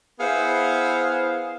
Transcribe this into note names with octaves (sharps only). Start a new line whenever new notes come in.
B3 E4 G#4 C5 F5